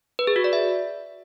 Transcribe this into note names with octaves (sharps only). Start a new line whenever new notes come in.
B4
G#4
F#4
D5
E5